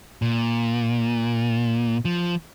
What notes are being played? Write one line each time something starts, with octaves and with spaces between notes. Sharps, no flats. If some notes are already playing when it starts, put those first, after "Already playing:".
A#2
F3